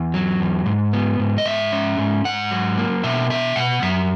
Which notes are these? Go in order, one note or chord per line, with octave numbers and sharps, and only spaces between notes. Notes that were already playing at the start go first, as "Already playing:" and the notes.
Already playing: E2
F#3
E2
G#2
B3
G#2
D#5
G#2 E5
C#4
G#2
G#2 F#5
F#3
A#3
B2 E5
B3 E5
B2 F#5
F#2 E5